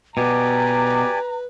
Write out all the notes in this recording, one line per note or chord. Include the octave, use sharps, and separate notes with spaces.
B2 G4 B4 D5 G#5 A#5